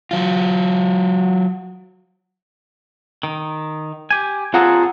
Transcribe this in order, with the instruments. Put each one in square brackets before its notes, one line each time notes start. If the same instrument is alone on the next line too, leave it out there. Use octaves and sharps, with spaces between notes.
[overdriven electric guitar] F#3 F4
[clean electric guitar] D#3
G4 G#5
[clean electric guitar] C4 G#4 A4 [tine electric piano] F4 F#5 A#5